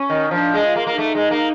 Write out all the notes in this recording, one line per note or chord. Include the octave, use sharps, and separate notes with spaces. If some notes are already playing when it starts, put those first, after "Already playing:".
Already playing: C#4
D#3
F3 D4
G#3
F4
A#3
A#3
A3 D#4
G#3
A#3